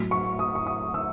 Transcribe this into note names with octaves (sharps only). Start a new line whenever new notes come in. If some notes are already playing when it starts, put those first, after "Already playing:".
Already playing: A2 F#3
C#6
D#6
C#6
D#6
E6